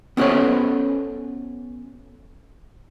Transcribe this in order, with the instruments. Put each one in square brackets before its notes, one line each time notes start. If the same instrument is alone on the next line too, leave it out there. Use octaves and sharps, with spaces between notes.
[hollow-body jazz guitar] B3 C#4 F#4 A4 C5 C#5